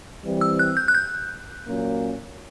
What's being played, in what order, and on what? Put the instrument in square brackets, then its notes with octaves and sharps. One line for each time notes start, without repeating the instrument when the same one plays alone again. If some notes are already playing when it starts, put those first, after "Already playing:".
[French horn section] E3 G3 C4
[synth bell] E6
F#6
G6
F#6
G6
[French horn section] A#2 F#3 A#3 C#4